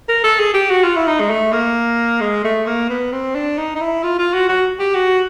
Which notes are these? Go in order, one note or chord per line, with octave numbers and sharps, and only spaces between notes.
A#4
A4
G#4
G4
F#4
F4
E4
D#4
G#3
A3
A#3
G#3
A3
A#3
B3
C4
D4
D#4
D#4
E4
F4
F4
F#4
F#4
G4
F#4